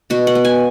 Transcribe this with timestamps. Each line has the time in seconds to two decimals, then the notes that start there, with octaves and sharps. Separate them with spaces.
0.10 B2 F#4
0.27 F#5
0.35 B3
0.45 G#5